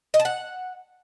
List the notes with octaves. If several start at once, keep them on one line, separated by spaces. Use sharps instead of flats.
D#5
A5
F#5